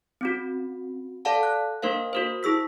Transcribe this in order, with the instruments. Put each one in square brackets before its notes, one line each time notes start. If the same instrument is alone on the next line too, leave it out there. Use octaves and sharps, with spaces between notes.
[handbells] C4 C#4 F#4
A4 D5 F5 F#5 A5
F#6
A#3 D4 A#4 C5 F5
F#4 A#4 C5
E4 G#4 E6 B6